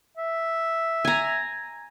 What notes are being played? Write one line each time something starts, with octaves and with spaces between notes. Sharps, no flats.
E5
G#5 A#5